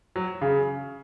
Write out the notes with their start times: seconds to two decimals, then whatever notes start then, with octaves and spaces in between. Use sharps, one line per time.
0.16 F#3
0.42 C#3